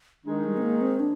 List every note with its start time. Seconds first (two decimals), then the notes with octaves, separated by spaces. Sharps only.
0.25 D#3 G#3 D4 D#4
0.44 G3
0.57 C4
0.62 A#3
0.81 C4
1.00 D4